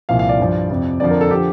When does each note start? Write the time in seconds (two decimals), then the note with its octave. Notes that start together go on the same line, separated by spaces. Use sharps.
0.09 C2 A#2 F3 F5
0.19 F5
0.29 D5
0.39 G2 F3
0.70 F2 C3 F3
1.00 F2 D3 F3 D5
1.11 A#4
1.21 A4
1.31 D3 F3 G4